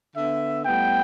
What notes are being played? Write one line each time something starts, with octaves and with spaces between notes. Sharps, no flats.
D3 B3 E5
A2 G3 B3 G5